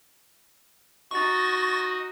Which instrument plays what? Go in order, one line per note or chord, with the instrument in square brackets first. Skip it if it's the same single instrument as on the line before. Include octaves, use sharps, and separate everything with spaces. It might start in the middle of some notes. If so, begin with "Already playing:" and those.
[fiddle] D#4 F#4 [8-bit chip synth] C#6 A6